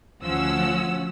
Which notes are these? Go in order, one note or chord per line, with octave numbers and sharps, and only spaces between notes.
D2 F3 C#4 F#5 E6